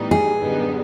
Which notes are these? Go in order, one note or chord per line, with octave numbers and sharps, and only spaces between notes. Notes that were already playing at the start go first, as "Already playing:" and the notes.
Already playing: A2 E3 G3 B3 D#4
G#4
F#2 D3 G3 B3 D#4